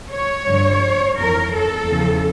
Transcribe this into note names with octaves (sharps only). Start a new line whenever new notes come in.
C#5
G2 D3 F3
F2 E3 A#4
A4
E2 C#3 F3